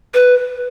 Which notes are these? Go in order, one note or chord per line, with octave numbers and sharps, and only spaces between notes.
B4